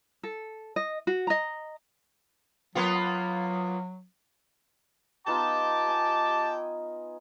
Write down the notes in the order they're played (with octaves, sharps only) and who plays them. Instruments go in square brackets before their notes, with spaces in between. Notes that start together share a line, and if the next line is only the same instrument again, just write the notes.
[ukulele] A4
D#5
F#4
D#5 A#5
[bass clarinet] F#3 [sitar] A#3 B3 F4
[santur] B3 D#4 F4 [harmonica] G5 D6 [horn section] A5
[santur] D#5 G#5